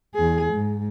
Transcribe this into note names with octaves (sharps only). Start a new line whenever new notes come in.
E2 G#4
G#2